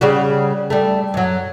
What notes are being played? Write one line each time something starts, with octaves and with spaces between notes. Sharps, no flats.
C#3 G3 F#4
G3 A3
F#2 F#3